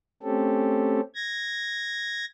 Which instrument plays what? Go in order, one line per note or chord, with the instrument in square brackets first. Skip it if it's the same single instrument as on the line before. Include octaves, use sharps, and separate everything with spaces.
[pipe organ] A3 C4 C#4 G4 A4
G#6 A#6